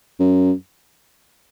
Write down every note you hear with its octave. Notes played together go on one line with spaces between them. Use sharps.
F#2